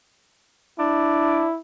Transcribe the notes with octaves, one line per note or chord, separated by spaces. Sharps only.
D4 E4